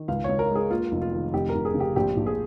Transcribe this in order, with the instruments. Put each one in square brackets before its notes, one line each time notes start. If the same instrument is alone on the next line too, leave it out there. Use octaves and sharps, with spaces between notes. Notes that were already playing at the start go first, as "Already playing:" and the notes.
Already playing: [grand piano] D#3
C#2 F5
C#2 C#5
A#4
G#3
G#4
A#3 F4
F1
F4
D#3
F1 G4
F1 A#4
G#4
C#3
G4
A#1 G4
A#1
G#4